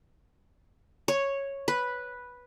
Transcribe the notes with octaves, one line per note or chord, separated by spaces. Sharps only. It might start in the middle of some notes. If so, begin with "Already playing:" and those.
C#5
B4